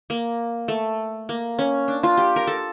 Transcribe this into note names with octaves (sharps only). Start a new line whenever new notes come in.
A#3
A3
A#3
C#4
D4
F4
G4
A#4
A4